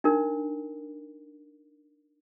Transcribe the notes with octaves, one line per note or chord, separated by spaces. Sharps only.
D4 D#4 A#4